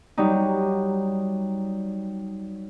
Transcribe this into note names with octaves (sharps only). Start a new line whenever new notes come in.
F#3 G3 D#4